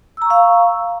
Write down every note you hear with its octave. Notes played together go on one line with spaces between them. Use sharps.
F5 A#5 C#6 E6